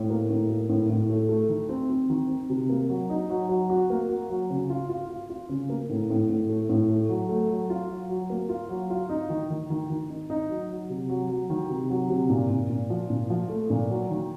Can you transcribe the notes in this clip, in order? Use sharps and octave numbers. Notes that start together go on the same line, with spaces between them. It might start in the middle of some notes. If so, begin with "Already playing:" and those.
Already playing: A2
A#3
A2
A#3
A2
A2
A3
A3
D#3
C4
C4
D#3
C4
C3
A#3
F#3
D#4
F#3
F#3
F#4
A#3
F#4
F#3
C#3
F4
F4
F4
F4
C#3
A#3
A2
A2
A2
A3
A2
A3
F#3
A3
F#3
F4
F#3
F#3
A#3
F4
F#3
F4
D#4
D#3
D#3
D#3
D#3
D#4
D#4
F#3
F#3
C3
F#3
F#3
D#3
C3
F#3
C3
A#2
A#2
A#2
F3
A#2
F3
A3
A#2
F#3
D#3